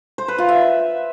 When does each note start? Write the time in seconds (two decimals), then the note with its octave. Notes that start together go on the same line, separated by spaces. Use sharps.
0.18 C5
0.28 B4
0.38 F4
0.48 E5